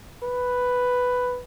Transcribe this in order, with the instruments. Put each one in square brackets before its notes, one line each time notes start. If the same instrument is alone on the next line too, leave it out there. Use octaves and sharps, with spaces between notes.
[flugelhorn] B4